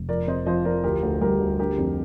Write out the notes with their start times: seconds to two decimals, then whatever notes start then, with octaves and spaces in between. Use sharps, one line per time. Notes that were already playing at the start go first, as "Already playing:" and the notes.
Already playing: F1
0.08 F3 A#4 D5
0.27 C3 C5 D#5
0.46 F3 C5 D#5
0.65 F3 A#4 D5
0.84 D2 G4 A#4
1.03 D2
1.21 G3 G4 A#4
1.41 D2
1.59 D4 G4 A#4
1.78 F2